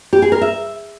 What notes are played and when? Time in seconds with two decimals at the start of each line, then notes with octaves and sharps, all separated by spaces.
0.13 G4
0.22 G#4
0.32 A#4
0.41 E5